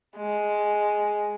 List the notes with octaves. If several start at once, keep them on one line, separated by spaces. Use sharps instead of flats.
G#3